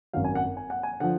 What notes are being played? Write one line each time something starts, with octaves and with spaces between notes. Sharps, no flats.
G#1 F#2 D#3 F#3 F5
G#5
F#5
G#5
F#5
G#5
D3 F3 F#5